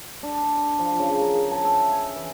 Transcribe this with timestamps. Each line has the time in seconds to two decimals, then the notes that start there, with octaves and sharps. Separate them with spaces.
0.23 D4
0.57 C6
0.79 F3
0.99 C#3
1.21 A#4
1.35 G#4
1.52 A5
1.65 E5
1.92 G#5
2.16 E3